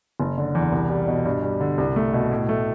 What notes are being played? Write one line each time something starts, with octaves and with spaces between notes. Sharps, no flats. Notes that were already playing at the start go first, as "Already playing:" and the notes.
F#1
D3
E2
C2
G3
B2
G2
G3
D3
C2
A3
B2
A2
A3